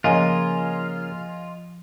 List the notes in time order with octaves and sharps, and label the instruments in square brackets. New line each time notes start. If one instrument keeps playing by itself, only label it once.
[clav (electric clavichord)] C#3 A#3 [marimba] F3 [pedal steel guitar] F4 [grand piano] D#5 G#5